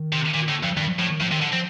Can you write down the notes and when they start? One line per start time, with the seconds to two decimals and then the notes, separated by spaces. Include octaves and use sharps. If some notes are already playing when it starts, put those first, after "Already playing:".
Already playing: D#3
0.13 C3
0.34 A#2 D#3
0.49 A2 D3
0.63 G2 F3
0.77 G2 D#3
0.88 F3
0.98 A2 F3
1.10 D#3
1.21 A2 F3
1.31 C3 D#3
1.42 D3
1.53 F3 C4